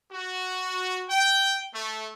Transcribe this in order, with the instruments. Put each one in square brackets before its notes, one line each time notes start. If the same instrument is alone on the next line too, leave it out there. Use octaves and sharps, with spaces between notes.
[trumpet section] F#4
G5
A3